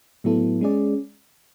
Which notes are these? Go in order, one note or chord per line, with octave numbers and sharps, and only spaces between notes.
A2 F#3 B3 E4 A4
G#3 C#4 G#4 D5